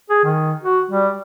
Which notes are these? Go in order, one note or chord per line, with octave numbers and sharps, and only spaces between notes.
G#4
D#3
F#4
G3